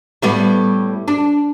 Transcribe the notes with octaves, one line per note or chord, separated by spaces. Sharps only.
A2 G3 B3
D4